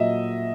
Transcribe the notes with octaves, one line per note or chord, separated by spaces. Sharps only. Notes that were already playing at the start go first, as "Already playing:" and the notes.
Already playing: A#2 F#3 D#5 E5